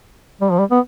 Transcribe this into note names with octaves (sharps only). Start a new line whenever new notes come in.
G3
F3
G3
B3